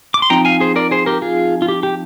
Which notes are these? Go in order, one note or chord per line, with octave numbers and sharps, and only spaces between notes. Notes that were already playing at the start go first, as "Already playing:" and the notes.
D6
C6
F3 C4 D#4 G5 A#5
F5 G#5
G#4 C5
A#4 D5
G#4 C5
G4 A#4
F4 G#4
F4
G4
G4